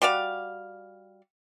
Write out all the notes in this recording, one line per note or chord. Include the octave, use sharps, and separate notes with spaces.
G3 F#4 D5 F5